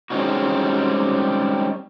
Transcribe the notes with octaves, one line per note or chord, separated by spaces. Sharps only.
G3 G#3 C4 C#4 D#4 F#4